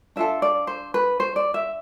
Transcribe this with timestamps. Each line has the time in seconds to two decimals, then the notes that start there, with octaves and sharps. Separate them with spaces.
0.16 D4 F4 A4 E5
0.42 D5
0.67 C5
0.94 B4
1.20 C5
1.36 D5
1.54 E5